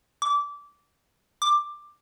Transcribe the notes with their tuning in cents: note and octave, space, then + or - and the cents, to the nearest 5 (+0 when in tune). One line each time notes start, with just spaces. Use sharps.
D6 -20
D6 +10